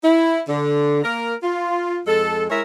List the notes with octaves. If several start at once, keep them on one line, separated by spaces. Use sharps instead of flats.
E4
D3
A#3 A#4
F4
F2 G#3 A4
G#3 E4 A#4 C#5 E5